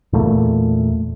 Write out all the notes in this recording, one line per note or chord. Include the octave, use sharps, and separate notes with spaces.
E2 A#2 A3